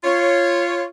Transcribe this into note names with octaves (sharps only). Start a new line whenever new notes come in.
F4 C#5